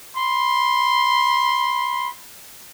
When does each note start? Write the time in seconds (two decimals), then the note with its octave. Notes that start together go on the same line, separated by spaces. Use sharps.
0.17 B5 C6